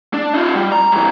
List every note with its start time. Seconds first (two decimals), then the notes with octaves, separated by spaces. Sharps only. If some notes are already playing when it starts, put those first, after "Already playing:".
0.14 D4
0.35 D#4 F4
0.55 G3
0.72 A#5
0.92 G2 E3